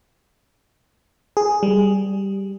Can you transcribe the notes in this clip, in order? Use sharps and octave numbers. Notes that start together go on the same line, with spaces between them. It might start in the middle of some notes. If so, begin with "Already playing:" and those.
G#4
G3